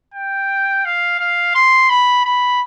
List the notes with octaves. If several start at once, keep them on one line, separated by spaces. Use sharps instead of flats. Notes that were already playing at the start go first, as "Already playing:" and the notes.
G5
F5
F5
C6
B5
B5